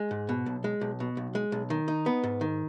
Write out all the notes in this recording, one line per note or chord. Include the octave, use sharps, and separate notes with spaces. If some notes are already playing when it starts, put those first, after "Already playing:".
Already playing: G#3
G#2
B2
B1
G#3
B1
B2
B1
G#3
B1
D#3
D#4
B3
G#2
D#3